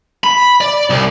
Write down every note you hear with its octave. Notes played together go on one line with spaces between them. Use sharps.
B5
D5
C2